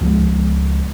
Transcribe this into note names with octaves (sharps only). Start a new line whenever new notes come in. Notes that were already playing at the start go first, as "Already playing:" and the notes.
C#2 F3 G#3 B3